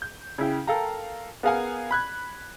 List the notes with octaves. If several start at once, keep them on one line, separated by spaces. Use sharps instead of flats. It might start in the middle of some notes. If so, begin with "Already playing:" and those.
G6
C#3 E4 G5
A4 A#4 F5 G5 A#5
B3 G#4 A#4 F5 F#5 G#5
B5 F#6 G#6